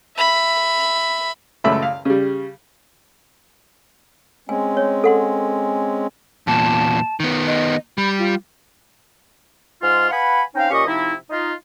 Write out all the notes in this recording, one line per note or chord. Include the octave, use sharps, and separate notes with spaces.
E5 B5
C#2 F#2 A3 E5 B5
F5
C#3 G3
G#3 C4 C#4 G#5
C#5
A4 F#5 C6
E2 A#2 A5
D#3 B3
D#5
G3 B5
F4
G#2 F4 F6
B4 F5 F#5 G#5 B5
C4 C#4 D#4 F5 G5
A#2 C#4 G4 D#5 C#6
C3 F3 D#4 E4
D#4 F4